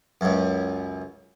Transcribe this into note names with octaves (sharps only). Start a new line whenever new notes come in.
C#2 F#2